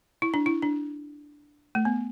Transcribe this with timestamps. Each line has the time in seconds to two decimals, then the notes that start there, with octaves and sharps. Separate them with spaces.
0.22 E4
0.34 D4
0.46 E4
0.62 D4
1.75 A3
1.85 B3